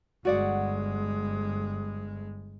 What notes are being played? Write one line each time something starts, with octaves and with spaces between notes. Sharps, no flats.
G1 G#3 F#4 D5 F#5